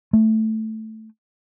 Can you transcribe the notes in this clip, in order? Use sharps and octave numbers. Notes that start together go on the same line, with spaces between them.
A3